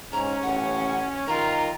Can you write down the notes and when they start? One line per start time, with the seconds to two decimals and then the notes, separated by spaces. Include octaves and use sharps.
0.13 G#2 C#4 A#5
0.43 A1 F#5
1.27 D#3 F4 A#4 A#5